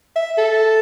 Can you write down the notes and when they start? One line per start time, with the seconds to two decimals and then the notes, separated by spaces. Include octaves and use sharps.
0.16 E5
0.38 A4